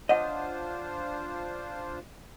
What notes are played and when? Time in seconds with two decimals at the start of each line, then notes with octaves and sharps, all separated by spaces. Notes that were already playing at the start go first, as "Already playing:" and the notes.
0.09 D4 F4 C5 C#5 D#5 F#5